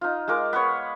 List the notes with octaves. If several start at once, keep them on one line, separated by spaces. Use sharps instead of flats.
D#4 F4
G#3 F4 A#4 D6
B3 B4 C#5